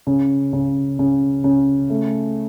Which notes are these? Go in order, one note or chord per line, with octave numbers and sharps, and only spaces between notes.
C#3
C#3
C#3
C#3
A3